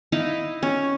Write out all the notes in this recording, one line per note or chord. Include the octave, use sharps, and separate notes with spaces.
D#4 E4 D#5 F5
C#4